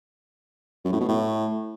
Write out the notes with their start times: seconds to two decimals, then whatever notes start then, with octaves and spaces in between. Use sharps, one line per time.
0.84 F#2
0.92 A2
1.00 B2
1.08 A2